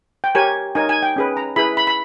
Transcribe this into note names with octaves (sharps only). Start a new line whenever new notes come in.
G5
G4 A#4 C#5 G#5
D#4 A#4 C#5 G#5
G#5
G5
C#4 G#4 B4
A#5
E4 G#4 B4 B5
B5
B5